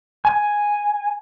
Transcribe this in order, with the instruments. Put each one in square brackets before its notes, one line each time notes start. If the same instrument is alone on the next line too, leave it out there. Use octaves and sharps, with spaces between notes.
[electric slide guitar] G#5